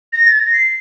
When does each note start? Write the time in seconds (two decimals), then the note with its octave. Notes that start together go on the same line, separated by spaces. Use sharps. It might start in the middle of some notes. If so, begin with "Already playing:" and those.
0.13 A#6
0.27 A6
0.39 A#6
0.53 C7